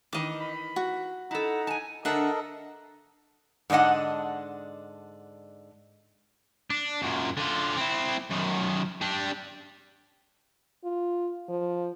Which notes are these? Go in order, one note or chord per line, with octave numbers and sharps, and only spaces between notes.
D#3 E3 D#5 D6
B5
F#4
D#4 E4 A4 F#5 A#5
G#5 A5
D3 D4 A4 A#4 D#5 E5 F#5
G#2 D3 D4 D#5 F#5
D4
F#2 A#2
D3 F4
C4 E4
F#2 D#3
G3 D4
F4
F3